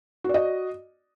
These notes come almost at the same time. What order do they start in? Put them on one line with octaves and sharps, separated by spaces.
F#4 D5 D#5